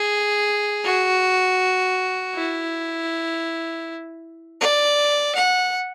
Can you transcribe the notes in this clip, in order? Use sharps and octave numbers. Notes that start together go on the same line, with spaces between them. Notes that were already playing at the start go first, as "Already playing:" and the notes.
Already playing: G#4
F#4
E4
D5
F#5